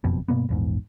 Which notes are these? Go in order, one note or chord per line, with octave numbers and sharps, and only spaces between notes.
F#1 F2 B2
G2 B2 A#3 B3
A#1 E2 G#2